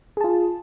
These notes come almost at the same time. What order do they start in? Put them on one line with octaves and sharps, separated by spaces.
G#4 A5 F4